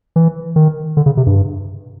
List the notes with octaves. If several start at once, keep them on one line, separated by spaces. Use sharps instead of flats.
E3
D#3
D3
C#3
C3
G2